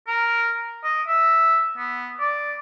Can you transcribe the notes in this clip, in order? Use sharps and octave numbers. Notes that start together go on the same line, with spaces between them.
A#4
D#5
E5
B3
D5